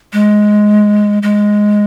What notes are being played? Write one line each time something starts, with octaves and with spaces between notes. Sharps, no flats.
G#3
G#3